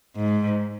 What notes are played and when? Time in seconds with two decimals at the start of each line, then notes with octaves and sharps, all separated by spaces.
0.15 G#2